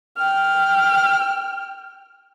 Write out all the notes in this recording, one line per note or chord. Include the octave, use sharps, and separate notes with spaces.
G5 F6